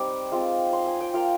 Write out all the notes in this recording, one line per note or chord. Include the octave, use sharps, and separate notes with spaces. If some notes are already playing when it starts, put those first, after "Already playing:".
Already playing: G3 C4 D#4 D6
G#3 C4 F4
C6
G#5
G5
A#3 F4 F5